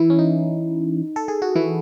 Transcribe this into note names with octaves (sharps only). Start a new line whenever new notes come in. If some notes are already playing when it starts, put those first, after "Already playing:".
Already playing: E3 E4
C#4
D#4
A4
G#4
F#4
E3 E4